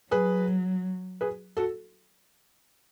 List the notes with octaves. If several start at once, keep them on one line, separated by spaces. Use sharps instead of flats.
F#3 G#4 B4
G#4 B4
F#4 A4